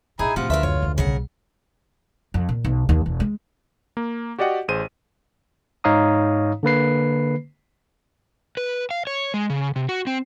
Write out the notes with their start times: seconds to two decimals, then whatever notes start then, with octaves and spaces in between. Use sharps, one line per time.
0.19 A#1 D#3 D#4 E4 G#4 G#5
0.36 A2 C3 F3 D4 F4 F#5
0.50 D2 A#4 B4 E5
0.63 F#2 C#5
0.82 F2 C#3
0.98 B1 C#3 G3 A#4 F#5
2.34 F2
2.49 A#2
2.64 B1
2.89 D#2
3.06 E1
3.20 G#3
3.97 A#3
4.38 F#4 G4 D5 D#5 F#5 G5
4.68 A1 G#4 C5 D#7
5.84 G#2 D#4 C#5 F5 A#5 D#6
6.63 D3 A#3 B4 C7
8.57 B4
8.91 F5
9.07 C#5
9.34 G#3
9.50 C#3
9.76 C3
9.89 F#4
10.07 C4